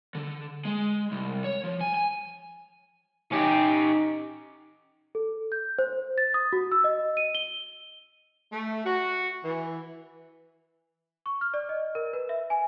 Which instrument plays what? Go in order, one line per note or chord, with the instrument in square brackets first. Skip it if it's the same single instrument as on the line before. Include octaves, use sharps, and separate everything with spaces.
[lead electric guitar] D3
G#3
C2
C#5
F3
G#5
G#5
[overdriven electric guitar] C#4 G4 [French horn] D#4
[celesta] A4
G6
C5
A6
D#6
F#4
E6
D#5
D#7
G7
[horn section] A3
F#4
E3
[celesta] C#6
F6
D5
D#5
A#4
B4
E5
G#5